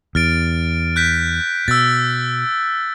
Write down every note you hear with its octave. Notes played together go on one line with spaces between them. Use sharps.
E2 F6 A6 D7
F#6 G6 B6
B2 E6 A6